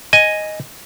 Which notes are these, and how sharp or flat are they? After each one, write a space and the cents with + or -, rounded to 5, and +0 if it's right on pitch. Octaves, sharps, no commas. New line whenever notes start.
D#5 +0 G#5 +0